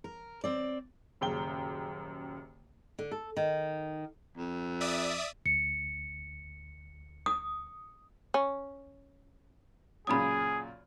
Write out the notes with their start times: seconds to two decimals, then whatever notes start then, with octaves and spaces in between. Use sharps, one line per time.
0.04 A#4
0.44 C4 D5
1.21 D#1 F#2 C#3 G5 G7
2.99 D3
3.11 A4
3.37 D#3
4.37 F2
4.81 D5 E5 D#6
5.46 D2 C#7
7.26 D#6
8.34 C#4 C#6
10.07 F#2 A#2 C#3 G#4 B5 D#6